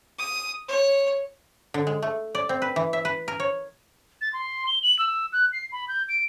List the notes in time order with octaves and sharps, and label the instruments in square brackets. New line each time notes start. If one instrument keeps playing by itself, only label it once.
[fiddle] D#6
C#5
[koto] D3
G#3
A3
D5
C4
B4
E3
E5
B4
A#4
C#5
[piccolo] A6
C6
G7
F#7
E6
F#6
C7
B5
G6
D7